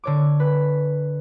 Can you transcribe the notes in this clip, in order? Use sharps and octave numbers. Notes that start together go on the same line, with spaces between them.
D3 C#5 D6
B4